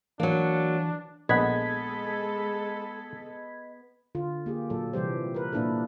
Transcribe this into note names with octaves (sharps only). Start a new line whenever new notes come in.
E3 F#3 A#3 D4
A#1 G#3 B3 A4 D#5 F#5 G#6 B6
D3 F4
A#3 G4 G#4
A#2 F#3 A4
C3 E3 G3 G4 C5
A#4 B4
A#2 A#3 D4 E4 A4